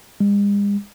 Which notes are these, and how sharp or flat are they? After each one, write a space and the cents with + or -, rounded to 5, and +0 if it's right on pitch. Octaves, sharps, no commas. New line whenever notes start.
G#3 -45